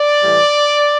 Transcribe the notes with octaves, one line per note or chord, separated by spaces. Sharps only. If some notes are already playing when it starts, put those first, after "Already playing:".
Already playing: D5
A2 E3 G3